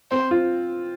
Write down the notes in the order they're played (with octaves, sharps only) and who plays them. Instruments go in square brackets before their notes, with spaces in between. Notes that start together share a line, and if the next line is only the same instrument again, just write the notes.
[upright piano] C4 [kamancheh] C5
[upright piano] F4